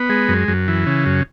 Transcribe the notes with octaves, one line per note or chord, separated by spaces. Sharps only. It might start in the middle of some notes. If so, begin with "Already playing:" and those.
Already playing: B3
G#3
F#2
F#2
E3
C#3
F#2